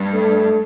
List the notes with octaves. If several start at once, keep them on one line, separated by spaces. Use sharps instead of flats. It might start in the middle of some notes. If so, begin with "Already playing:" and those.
Already playing: G2
A3